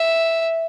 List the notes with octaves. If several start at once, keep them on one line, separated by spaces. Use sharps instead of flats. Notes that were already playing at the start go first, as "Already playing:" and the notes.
Already playing: E5